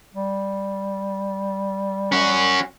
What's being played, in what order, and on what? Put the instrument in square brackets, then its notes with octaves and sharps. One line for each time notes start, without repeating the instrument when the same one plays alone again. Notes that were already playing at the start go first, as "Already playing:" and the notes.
[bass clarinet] G3
[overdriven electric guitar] C#4 F#4